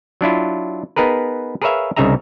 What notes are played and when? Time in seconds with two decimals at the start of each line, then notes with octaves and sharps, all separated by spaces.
0.21 F#3 D4 E4 F4
0.96 B3 D#4 G#4 A#4 B4
1.62 G#4 A#4 B4 C#5 E5 F5
1.96 C2 C#3 D#4 G#4 E5 A#5